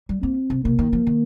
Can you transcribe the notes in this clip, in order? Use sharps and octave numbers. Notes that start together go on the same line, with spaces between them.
G3
A#3 C4
C3
C3 A#3
D#3
F3
D#3